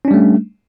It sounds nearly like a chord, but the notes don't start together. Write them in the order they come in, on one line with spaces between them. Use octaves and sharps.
C#4 D4 G3 A3